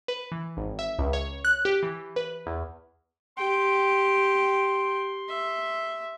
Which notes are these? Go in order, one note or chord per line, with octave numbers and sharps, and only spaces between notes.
B4
E3
G#1
E5
C#2
C#5
F#6
G4
E3
B4
E2
G4 G5 C6
E5